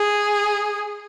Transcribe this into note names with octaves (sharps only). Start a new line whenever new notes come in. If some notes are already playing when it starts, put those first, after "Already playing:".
Already playing: G#4